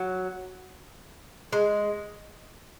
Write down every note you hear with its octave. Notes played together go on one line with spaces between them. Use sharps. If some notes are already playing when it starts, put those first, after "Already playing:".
Already playing: F#3
G#3